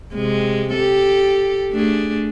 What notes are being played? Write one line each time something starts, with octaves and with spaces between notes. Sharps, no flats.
C3 G#3
G4 A4
A3 D4 G#4